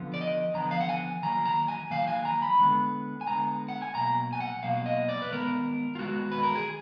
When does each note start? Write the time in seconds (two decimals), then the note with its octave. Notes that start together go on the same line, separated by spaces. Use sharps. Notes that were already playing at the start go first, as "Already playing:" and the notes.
Already playing: D3 F3 B3
0.14 D5
0.21 D#5
0.54 D3 F3 B3 A#5
0.71 F5
0.80 F#5
0.89 G#5
1.23 D#3 F#3 A#3 A#5
1.46 A#5
1.68 G#5
1.91 D#3 F#3 A#3 F5
2.08 G#5
2.25 A#5
2.42 B5
2.60 D3 G#3 B3
3.21 G#5
3.27 D3 G#3 B3 A#5
3.69 F#5
3.82 G#5
3.95 B2 F#3 A#3 A#5
4.33 G#5
4.40 F#5
4.63 B2 F#3 A#3 F5
4.86 D#5
5.09 D5
5.22 B4
5.31 D#3 G#3 B3 A#4
5.95 F4
5.99 D#3 G#3 B3 F#4
6.32 B4
6.43 A#4
6.55 G#4